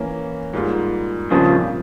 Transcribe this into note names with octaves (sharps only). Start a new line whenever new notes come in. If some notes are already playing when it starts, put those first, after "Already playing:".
Already playing: E3 A#3 C#4
G#2 G3 A#3 F4
A#2 C#3 F3 G3 C4 F4 A#4